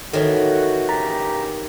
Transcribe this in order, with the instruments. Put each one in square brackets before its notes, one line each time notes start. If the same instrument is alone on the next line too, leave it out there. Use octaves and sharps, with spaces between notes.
[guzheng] D#3 E3 [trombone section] F#4 [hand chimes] A4 C#5
[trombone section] A#1 C#3 G4 [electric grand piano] A#5 [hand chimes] A6 B6